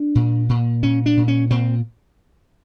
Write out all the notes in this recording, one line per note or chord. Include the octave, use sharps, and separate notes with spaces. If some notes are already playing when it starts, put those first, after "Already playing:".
Already playing: D4
A#2
A#2
A#2 C#4
D4
A#2
C#4
A#2 C4